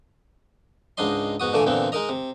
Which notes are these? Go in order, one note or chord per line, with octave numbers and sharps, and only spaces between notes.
C#2 G#2 D4 D#4 D#5 C6
G#2 B3 F#4 D#6
A#2 D3 E3 A3 G#5 D6
A#2 D3 E3 B3 C4
G#3 D#4 A#4 D#5 A#5
C3